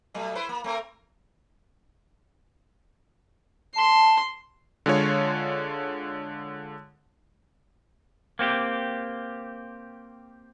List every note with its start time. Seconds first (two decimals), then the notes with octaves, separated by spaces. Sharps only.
0.14 B2 F#3 A3
0.35 E4 B4 C5
0.49 A#3
0.64 A3 C4 A#4
3.76 A5 C6
4.86 D3 G#3 F4 C#5
8.39 A#3 C4 F#4 G4